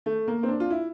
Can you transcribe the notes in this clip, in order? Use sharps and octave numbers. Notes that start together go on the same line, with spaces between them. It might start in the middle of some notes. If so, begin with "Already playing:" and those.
A3
A#3
C4
D4
F4
E4